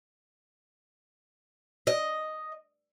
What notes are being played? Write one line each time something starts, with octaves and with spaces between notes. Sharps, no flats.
D#5